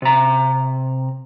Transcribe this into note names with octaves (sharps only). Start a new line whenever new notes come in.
C3 A#5